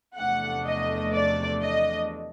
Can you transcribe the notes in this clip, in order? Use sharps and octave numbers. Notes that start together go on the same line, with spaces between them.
E2 C3 F3 A3 D4 F#5
D#5
D5
D#5